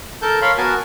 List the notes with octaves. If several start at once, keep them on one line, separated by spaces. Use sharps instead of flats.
A4 A#4 A5 G6
A#4 C#5 F5 B5 C6
B3 F#4 A#4 G#5 A5